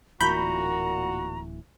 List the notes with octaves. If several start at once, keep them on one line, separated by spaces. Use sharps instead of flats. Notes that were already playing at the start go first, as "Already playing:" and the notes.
D1 A#2 E3 F#4 A#5 B5 G6